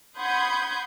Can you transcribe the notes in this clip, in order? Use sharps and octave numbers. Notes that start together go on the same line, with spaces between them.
F#5 B5 C6 D#6 G6 G#6